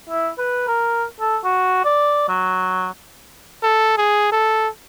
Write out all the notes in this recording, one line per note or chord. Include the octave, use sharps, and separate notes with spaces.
E4
B4
A#4
A4
F#4
D5
F#3
A4
G#4
A4